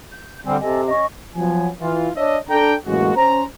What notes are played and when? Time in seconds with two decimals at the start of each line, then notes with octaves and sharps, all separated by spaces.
0.11 G6
0.45 D3 G3 C4 G#5
0.59 C3 A4 D#5 G#5
0.87 C#4 D#5 C#6
1.36 F3 F#3 B3 G#5
1.81 E3 F4
2.16 D4 C#5 D#5 E5
2.49 D4 A4 G5 A#5
2.86 A1 F#2 G#3 A#3 F#4
3.16 C#4 C5 A#5